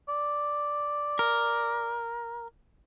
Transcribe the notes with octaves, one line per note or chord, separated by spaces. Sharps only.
D5
A#4